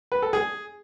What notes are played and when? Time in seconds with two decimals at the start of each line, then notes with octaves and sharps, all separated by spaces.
0.12 B4
0.22 A4
0.33 G#4